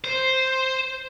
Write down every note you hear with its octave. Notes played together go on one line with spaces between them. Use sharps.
C5